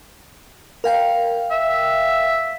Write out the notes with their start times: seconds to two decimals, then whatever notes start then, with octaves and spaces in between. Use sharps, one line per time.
0.84 A#4 F5 G5
1.51 E5